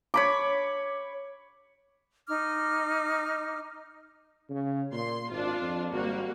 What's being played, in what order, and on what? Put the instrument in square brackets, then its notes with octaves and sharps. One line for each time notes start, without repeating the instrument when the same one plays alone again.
[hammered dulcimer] C#5 B5 D6
[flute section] D#4 D6 F6
[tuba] C#3
[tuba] A#2 [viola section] C6
[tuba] G#1 [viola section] D4 F4
[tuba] F2
[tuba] G#1 [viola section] G3 A#3 F#4